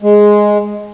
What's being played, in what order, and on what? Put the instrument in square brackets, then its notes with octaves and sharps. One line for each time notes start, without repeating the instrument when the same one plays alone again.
[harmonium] G#3